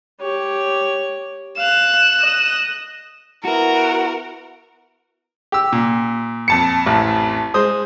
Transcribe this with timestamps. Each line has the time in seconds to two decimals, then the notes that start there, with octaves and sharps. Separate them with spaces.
0.21 G4 C#5
1.57 F5 F#6 E7
2.19 D#5
3.45 B3 E4 F#4 A#4
5.52 G4 E6
5.73 A#2
6.48 F2 A5 C#7
6.86 A1
7.54 G#3 C5 D#6